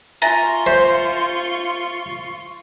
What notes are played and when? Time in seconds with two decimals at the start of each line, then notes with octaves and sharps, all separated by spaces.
0.22 F4 E5 G#5 A#5 C6 C#6 A6
0.66 C5 E5